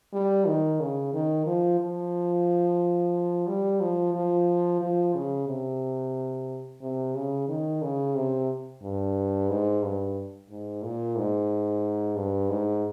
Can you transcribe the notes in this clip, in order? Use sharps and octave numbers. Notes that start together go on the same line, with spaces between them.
G3
D#3
C#3
D#3
F3
F3
G3
F3
F3
F3
C#3
C3
C3
C#3
D#3
C#3
C3
G2
G#2
G2
G#2
A#2
G#2
G2
G#2